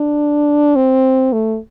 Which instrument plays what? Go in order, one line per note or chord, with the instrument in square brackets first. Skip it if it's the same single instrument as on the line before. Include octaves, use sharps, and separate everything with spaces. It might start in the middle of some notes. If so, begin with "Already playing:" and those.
Already playing: [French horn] D4
C4
A3